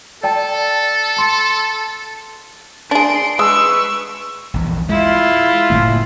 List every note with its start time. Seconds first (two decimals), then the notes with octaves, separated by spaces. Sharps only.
0.23 A4 D5 G5 A5
1.16 A5 C6 C#7
2.91 D4 G#4 C6 D7
3.39 G#3 B4 C#6 E6
4.54 A#1 E2
4.89 G#3 E4 F4
5.70 F#1 A2 A#3